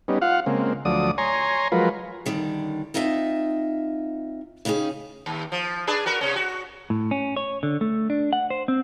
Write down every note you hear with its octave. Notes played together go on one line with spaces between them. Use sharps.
G3 B3 C#4 D#4
F4 F5 F#5
C#3 G#3 A#3 C4
D2 F3 F#3 A3 D5 D#6
C#5 G#5 A#5 C6
F3 F#3 G#3 F4 A#4 B4
F#2 D3 D#3 G3
C4 D#4 F4 D#5 E5
C#3 C#4 D#4 G4 G#4
D#2
F3
D4 G#4 B4
F#4 A#4 B4
C3 C#4
F#4
A2
C#4
C#5
D3
A3
D4
F#5
C5
C4